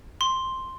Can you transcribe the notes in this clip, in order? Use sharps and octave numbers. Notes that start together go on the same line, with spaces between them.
C6